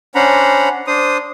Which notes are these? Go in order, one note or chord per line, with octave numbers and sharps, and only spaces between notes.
C#4 D4 C5 F#5 A#5 B5
D4 C5 D#6